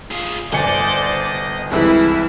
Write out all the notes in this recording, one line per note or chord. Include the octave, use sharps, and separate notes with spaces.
F4 G#4
G1 C5 D5 D#5 G#5 C#7
C2 E3 G#3 E4 B4